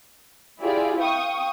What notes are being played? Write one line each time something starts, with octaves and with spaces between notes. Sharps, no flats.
E4 F4 G4 G#4 D5
F5 G5 C#6 D#6